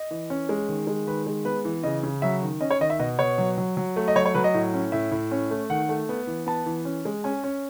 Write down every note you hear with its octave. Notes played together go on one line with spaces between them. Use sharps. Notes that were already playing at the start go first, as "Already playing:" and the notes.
Already playing: D#5
E3
C#4
G#3
D#3
G#3
D#3 B4
G#3
B3 B4
E3
C#3 D#5
C#3
F#3 E5
D#3
C#4 D#5
C#5
D#3 D#5
E5
B2 D#5
B2 C#5
F#3
F#3
F#3
A3
D#5
F#3 C#5
C#5
F#3 B4
D#5
A2
C#4
A2 E5
A2
C#4
A3
D#3 F#5
A3
B3
E3
B3 A5
E3
C#4
G#3
C#4 G#5
C#4